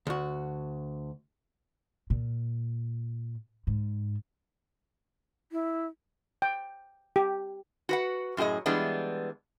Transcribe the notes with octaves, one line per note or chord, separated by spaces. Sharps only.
D2 F#4
A#2
G#2
E4
G5
G4
F#4 B4 F#5
F#2 A2 G4 G#4 D#5
E3 G3 G#3 B3 D4